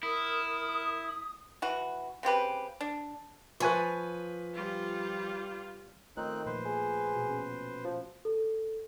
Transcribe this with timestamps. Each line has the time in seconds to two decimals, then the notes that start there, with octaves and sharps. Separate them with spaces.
0.03 E4 A#4 D#6
1.62 E3 F#4
2.23 C#3 C4 G4 B4
2.81 D4
3.60 F3 B4 G#5 C#6
4.53 G3 F4
6.17 D#3 A3 C4 D#4 F4 C#5 F#6
6.46 A#2 F3 B4 C5
6.66 G#4
7.14 B2 F#4
7.29 C#4
7.85 F3
8.25 A4